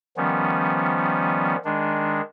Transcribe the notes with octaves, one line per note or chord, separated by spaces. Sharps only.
D#3 F3 G3 B3 C#4
D#3 G#3 D4